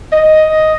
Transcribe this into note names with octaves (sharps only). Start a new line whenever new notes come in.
D#5